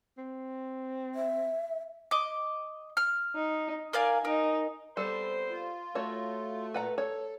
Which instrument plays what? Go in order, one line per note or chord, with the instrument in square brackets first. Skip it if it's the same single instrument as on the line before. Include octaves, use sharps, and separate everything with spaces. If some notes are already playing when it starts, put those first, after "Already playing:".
[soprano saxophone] C4
[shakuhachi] E5
[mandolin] D#5 D6
F6
[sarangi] D#4
[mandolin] A#4 D5 F5 [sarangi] G#5
[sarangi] D#4 [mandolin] A#4
[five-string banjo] G3 A4 [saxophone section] B3 C4 C5
[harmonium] F4
[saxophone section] A3 [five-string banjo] F#4 C#5
[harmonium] A#2 [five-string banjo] B4 F#5 A#5
[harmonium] A4 [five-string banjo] C#5